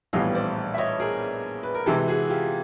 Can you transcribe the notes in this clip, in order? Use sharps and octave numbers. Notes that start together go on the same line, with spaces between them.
A#1 A2 E3 G3 B3 D#5 F5
C5 D5
E5
C#5 D#5
G#4 A#4
B4
A#4
C3 E3 G#3 G4 A4
F#4 G#4
F4 G4